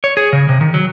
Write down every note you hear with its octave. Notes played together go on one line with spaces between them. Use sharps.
C#5
G#4
C#3
C3
D#3
F#3